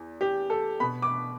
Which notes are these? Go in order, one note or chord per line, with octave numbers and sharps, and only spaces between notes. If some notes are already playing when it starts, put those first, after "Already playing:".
Already playing: E2
G4
A4
B2 B3 B5
D6